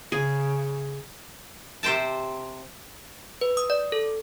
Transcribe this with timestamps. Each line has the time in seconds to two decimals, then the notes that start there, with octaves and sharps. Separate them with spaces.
0.12 C#3 G#4
1.83 C3 G4 C5 G5 A5
3.41 B4
3.57 D#6
3.70 D5
3.92 A4